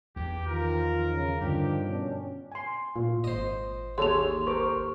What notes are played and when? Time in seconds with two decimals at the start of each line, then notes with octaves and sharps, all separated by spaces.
0.16 E2 G4
0.47 D#3 F3 F4 A#4
1.11 C#3
1.41 G2 D3 D#3 F3 G4
1.85 B2 C#4 D4
2.52 G#5 C6
2.96 A#2 F4
3.24 G#1 C5 D#5
3.98 D#2 G#4 A4 C#5 C6 F7
4.47 A#4 C5 C#6 D6